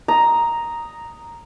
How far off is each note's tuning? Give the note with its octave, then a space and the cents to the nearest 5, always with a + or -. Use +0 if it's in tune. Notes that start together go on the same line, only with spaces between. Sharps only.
A#5 +0 D#6 +0